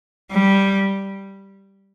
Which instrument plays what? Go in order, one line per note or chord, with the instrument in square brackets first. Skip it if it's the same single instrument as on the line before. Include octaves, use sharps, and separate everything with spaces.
[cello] G3